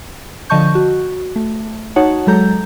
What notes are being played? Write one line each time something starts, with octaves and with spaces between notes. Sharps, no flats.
D3 F3 D#5 A5 C#6 G6
F#4
A3
D#4 F#4 C#5 F#5 A5
F#3 G#3 A4 A#5 G6